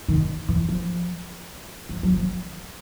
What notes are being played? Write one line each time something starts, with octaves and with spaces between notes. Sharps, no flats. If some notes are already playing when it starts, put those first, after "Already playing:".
D#3
E3
F3
F3
F#3
F3